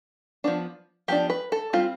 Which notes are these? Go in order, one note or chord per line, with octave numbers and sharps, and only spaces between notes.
F3 B3 D4
F3 B3 D4 G4
B4
A4
G3 C4 F4